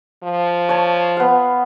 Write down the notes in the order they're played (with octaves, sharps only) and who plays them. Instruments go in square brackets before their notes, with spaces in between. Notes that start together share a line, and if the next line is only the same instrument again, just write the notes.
[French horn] F3
[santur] C#5 A5
B3 F5